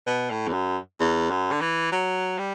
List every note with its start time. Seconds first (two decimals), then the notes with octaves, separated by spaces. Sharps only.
0.07 B2
0.31 A2
0.48 E2
0.53 F#2
1.00 E2
1.30 F#2
1.52 D3
1.61 E3
1.92 F#3
2.39 G3